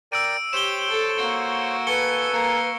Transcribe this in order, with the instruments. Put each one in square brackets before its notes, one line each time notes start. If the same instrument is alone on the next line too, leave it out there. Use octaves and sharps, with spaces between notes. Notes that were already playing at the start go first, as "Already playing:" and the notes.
[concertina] A#4 D5 G5 [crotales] E6 D7 D#7
[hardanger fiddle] G4 [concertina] C5 C#5 [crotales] E7 G7
[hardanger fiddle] A4
A#3 F#4
[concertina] A4 G#5 [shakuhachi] B4 [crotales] C#6 C#7 G7
[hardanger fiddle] A#3 A#4